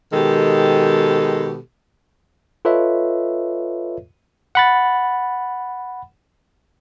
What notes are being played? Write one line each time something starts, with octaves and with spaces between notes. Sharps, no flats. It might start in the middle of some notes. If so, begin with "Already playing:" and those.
B2 D#3 G#3 G4 A4
F4 A4 B4 C#5 D#5 E5
F#5 B5 A6